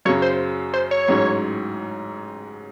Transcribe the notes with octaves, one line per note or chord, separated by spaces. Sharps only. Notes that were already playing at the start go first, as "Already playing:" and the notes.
F#2 C#3 F#3 C#5
C5
C5
C#5
A1 G#2 F#3 C#4